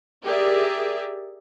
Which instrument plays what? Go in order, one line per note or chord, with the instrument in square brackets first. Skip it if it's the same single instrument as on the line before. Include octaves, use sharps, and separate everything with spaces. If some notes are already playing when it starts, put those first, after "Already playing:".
[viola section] G4 G#4 A#4 D5 E5